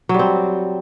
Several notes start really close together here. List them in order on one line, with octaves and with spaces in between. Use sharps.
F#3 G3 C4